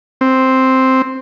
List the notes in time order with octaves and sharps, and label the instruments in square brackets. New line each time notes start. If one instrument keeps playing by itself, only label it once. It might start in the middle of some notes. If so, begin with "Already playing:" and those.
[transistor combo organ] C4